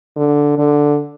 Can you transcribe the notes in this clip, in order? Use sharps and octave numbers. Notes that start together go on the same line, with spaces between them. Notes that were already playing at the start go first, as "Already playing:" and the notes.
D3
D3